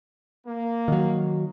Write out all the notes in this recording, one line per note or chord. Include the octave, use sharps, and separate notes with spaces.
A#3
D#3 F#3